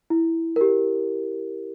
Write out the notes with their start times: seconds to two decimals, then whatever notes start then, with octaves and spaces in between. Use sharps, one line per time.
0.10 E4
0.56 G4 A#4